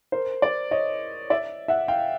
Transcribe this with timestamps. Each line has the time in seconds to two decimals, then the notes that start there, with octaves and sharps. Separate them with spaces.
0.12 A#4 C5
0.42 C5 D5
0.71 C#5 D#5
1.30 D5 E5
1.68 E5 F#5
1.88 F5 G5